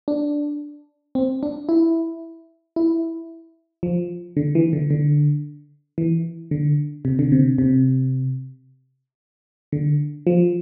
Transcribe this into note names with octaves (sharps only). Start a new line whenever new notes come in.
D4
C4
D4
E4
E4
F3
D3
E3
D3
D3
E3
D3
C3
D3
C3
C3
D3
F3